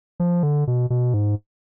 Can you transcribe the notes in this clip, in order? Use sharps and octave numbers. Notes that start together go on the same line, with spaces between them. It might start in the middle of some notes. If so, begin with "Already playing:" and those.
F3
D3
B2
B2
G#2